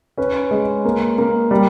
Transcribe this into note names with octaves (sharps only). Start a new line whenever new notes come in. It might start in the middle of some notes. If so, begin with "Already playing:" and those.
C#4 B4
G#3
A#3
A#3
G3